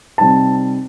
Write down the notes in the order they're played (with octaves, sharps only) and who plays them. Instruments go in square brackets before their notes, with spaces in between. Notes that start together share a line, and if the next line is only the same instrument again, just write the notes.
[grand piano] C3 G3 C4 D#4 A5